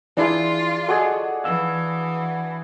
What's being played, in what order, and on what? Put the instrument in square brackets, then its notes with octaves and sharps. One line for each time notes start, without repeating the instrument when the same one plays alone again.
[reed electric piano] E3 E4 G#4 [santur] D4 [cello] F4
[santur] F#4 G#4 [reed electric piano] A4 D5 D#5
[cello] E3 [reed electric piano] F5 E6